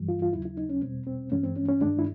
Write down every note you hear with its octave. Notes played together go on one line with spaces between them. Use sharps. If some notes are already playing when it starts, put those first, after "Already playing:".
Already playing: G2 E3 G3
F4
F4
D#2 C#3 F#3 E4
E4
D#4
C#4
E2 B2 G3 C4
C4
G2 E3 G#3 C#4
C4
C#4
C#4
G2 D#3 G#3 D4
E4